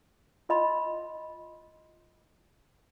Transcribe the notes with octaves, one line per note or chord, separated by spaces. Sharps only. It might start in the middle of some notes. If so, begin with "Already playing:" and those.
F4 D#5 B5 C6